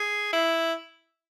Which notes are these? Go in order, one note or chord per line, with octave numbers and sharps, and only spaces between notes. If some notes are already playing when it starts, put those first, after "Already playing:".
Already playing: G#4
E4